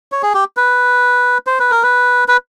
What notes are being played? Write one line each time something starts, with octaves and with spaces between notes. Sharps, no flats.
C#5
G#4
G4
B4
C5
B4
A#4
B4
B4